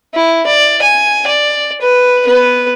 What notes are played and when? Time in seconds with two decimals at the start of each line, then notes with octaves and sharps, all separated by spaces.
0.14 E4
0.47 D5
0.82 G#5
1.27 D5
1.81 B4
2.25 B3 B4